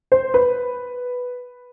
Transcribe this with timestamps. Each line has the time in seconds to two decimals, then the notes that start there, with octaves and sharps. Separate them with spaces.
0.12 C5
0.34 B4